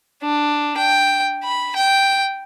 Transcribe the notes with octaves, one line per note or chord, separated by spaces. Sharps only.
D4
G5
B5
G5